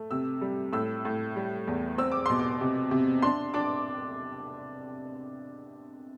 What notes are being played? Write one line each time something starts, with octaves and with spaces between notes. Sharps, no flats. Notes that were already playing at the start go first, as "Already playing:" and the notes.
Already playing: A3
C3 E6
G3
A2 E6
A2
G3
E2
C4 E6
D6
B2 C6
D6
C3
C3
D4 C6
D4 D6